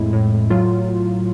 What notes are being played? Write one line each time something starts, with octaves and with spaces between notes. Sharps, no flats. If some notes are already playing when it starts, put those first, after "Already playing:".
Already playing: F2 A2 G#3 E4
A2
F#3 F4